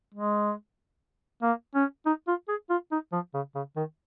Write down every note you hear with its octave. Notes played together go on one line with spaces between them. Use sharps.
G#3
A#3
C#4
D#4
F4
G#4
F4
D#4
F3
C#3
C#3
D#3